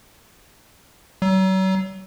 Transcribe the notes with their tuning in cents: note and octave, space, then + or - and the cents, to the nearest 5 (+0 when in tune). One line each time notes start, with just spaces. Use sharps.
F#3 +40